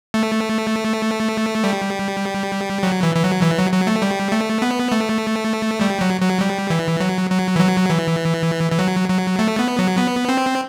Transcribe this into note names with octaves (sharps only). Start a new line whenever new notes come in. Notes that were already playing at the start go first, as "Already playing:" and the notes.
A3
G3
F#3
E3
E3
F#3
E3
F#3
F#3
A3
G3
A3
B3
A3
G3
F#3
F#3
G3
E3
F#3
F#3
E3
F#3
E3
E3
F#3
F#3
A3
B3
F#3
B3
C4